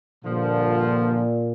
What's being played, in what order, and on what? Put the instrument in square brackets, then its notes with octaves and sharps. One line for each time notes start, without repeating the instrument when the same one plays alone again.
[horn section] G2 D3 F3 [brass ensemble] A#2